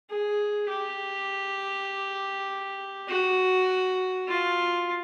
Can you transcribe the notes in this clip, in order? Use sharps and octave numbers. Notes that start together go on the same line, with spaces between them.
G#4
G4
F#4
F4